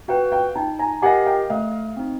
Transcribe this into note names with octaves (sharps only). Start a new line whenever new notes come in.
F#4 B4 F5 G5
F5 G5
D#4 G5 A5
G#5 A#5
G4 A#4 D#5 F#5 G#5
F5 G5
A3 D#5 F5
C4 D#4